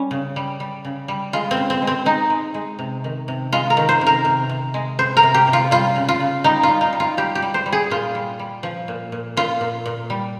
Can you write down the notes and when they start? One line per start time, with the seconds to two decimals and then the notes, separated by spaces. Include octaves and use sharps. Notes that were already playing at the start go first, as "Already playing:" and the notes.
Already playing: G3 C#4
0.11 C#3
0.36 G3
0.60 G3
0.85 C#3
1.08 G3
1.33 G#3 F4
1.51 C4
1.57 C#3
1.70 C4
1.82 G#3
1.87 C4
2.06 G#3 D#4
2.30 G#3
2.54 G#3
2.79 C3
3.04 D#3
3.28 C3
3.52 G#3 F4
3.70 A#4
3.77 D#3
3.89 C5
4.01 C3
4.07 A#4
4.25 C3
4.49 C3
4.74 G#3
4.99 C3 C5
5.17 A#4
5.23 C3
5.34 G4
5.47 C3
5.53 F4
5.71 G3 F4
5.96 C#3
6.09 F4
6.20 C#3
6.44 G3 D#4
6.63 G3 F4
6.81 D#4
6.93 G3
7.00 F4
7.17 G3 G4
7.35 G4
7.42 G3
7.54 C5
7.66 G3
7.73 G#4
7.90 A#2 F4
8.15 G3
8.39 G3
8.63 F3
8.88 A#2
9.12 A#2
9.37 A#2 F4
9.61 A#2
9.86 A#2
10.10 G3